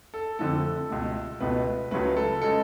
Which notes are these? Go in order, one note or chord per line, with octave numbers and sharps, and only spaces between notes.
A4
F2 D3 F3 A3 A4
C#2 B2 A3
C#2 B2 A3 B4
C#2 C#3 F#3 A3 B4
A4
C#3 G#3 A4